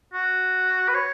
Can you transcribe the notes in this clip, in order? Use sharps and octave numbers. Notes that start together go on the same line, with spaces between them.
F#4
B4
C#5